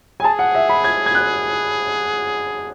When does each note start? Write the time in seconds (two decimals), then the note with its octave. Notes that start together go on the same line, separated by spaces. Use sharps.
0.20 G#5
0.24 G#4 A5
0.39 F#5
0.55 E5
0.69 B5
0.84 G#6
1.06 G#6
1.15 F#6